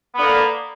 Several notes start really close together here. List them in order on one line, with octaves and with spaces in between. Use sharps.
B3 D3 A#3